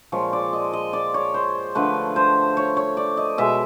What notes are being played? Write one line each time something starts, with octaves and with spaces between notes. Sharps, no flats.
A#2 F3 G#3 C#5
D5
D#5
D#5
D5
C#5
C5
D3 F3 A3 B4
C5
C#5
C#5
D5
D#5
B2 G#3 E5